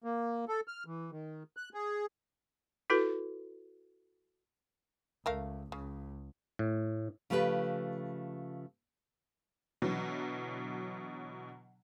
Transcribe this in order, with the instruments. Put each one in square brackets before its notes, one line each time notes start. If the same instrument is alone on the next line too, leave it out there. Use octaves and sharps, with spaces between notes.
[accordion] A#3
A4
F6
E3
D#3
F#6
G#4
[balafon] E4 F#4 A4 B4
[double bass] C#2 [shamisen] A3 A#4 F5
[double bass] C#2 [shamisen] C#3
[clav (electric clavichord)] A2
[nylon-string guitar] C#3 F3 A3 G4 B4
[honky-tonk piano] B2 D3 E3 F#3